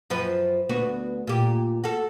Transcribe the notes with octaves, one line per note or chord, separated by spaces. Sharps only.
F#2 F3 B4
D2 B3 F#4
A#2 G4
F#4 A4